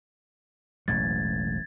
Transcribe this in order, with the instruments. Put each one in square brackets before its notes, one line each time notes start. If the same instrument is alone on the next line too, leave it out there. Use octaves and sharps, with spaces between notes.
[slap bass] E1 A1 F#3 [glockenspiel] G#6 A6